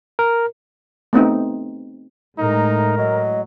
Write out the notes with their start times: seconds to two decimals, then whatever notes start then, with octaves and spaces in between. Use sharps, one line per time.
0.19 A#4
1.13 A3 B3 C4 D#4
2.38 A2 G#3 D#4 A#4
2.98 F#3 D#5